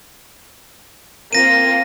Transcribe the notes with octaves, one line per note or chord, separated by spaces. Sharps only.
A#3 C4 F4 A#6 D#7